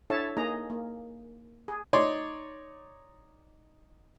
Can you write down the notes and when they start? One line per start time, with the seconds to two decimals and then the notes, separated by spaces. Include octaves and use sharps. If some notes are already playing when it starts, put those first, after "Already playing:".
0.10 D4 E4 A4 C#5 E5 A5
0.37 A#3 D#4 G#4 D#5 A#5
0.70 A#3
1.68 G#4
1.93 D#4 C#5 D5 C6 D6